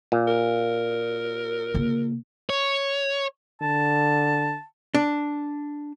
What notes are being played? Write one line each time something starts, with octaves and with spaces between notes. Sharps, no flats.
A#2
A#4
C#3 A#3
C#5
D3 A5
D4